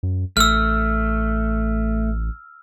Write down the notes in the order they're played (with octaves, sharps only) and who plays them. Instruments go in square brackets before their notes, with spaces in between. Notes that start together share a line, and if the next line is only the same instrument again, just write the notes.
[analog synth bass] F#2
[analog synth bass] A1 [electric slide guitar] A3 [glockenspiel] E6 F6